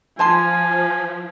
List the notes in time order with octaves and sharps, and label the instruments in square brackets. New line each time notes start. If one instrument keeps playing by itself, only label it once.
[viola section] F3 [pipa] C5 A5 C6 [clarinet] G#5